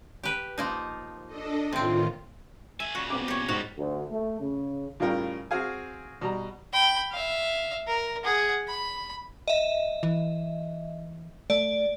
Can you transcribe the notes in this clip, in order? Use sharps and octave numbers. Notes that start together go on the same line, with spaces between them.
G4 B4
F3 A#3 D#4
D4 A4 D#5
A2 C3 D#3 C4 F4
A3 E5 G#5
A#2 C#3 F#4
B3 C4 D6
G4 C#5
G#2 F3 G3 F#4
D2
A3
C#3
A2 C#3 G3 F4 A#4 G5
C4 F#4 G#4 F5 G#5
B2 G3 A#5
G5 B5
E5 F5
A#4
G#4 F#5
B5
D#5 E5
E3
A3 D5